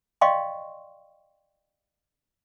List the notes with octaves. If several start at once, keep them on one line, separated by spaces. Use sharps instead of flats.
D5 D#5 F5 G5 C6 C#6